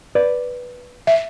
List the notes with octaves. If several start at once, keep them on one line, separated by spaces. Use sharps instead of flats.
B4 D5
E5